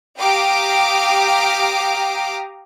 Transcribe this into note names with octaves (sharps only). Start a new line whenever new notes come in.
G4 F5 G5 A#5 D6 D#6